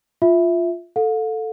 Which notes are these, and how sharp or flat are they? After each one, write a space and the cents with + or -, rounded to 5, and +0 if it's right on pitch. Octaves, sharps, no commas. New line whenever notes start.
F4 +0 E5 +0
A4 +5 F5 +45